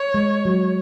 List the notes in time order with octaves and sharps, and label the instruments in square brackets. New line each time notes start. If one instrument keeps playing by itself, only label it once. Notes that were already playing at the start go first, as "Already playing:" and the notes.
Already playing: [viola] C#5
[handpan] G#3
F#3